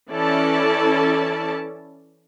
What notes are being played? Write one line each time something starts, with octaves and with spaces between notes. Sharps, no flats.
E3 C#4 E4 A4 D5 A5